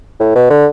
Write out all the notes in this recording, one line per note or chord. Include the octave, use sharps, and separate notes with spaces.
A2
B2
D3